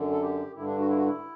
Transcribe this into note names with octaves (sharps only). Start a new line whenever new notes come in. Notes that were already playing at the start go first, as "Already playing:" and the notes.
Already playing: F#2 D3
A4
G4
G2 D3 E4
D4
F#4
E4
F#4
E4